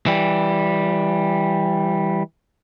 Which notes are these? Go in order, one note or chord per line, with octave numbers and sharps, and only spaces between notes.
E3 G3